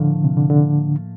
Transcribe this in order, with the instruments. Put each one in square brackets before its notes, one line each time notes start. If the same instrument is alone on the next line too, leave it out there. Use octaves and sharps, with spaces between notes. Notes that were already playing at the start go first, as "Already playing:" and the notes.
Already playing: [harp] A2 F3 A#3 [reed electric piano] D3
[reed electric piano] C3
D3
D3